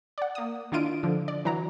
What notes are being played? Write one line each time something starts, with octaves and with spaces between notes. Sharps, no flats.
D5 F#5
A#3 D#6
D#3 D4 E4 F4 D7 D#7
D3 F3
D5
E3 F#3 A#5